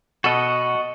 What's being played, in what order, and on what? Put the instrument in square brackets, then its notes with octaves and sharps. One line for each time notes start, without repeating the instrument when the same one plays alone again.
[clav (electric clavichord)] B2 A4 [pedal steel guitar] F#4 D#5 F#5